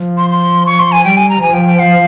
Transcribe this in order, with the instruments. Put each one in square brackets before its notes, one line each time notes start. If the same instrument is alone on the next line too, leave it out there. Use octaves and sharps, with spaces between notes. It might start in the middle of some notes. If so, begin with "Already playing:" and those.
Already playing: [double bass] F3
[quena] C6
C6
C#6
C6
G#5
[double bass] G3 [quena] G5
[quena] G#5
A#5
[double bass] F3 [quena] G#5
[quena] G5
G5
F5